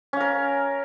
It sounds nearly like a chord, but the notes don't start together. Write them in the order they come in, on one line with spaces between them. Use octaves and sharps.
C#4 F5 A#4